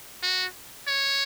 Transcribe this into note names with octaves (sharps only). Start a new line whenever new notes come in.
F#4
C#5